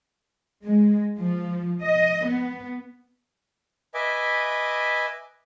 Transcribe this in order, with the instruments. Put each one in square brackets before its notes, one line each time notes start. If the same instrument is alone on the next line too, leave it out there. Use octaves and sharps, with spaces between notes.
[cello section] G#3
F3
D#5
B3
[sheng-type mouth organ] B4 D#5 E5 G#5 D6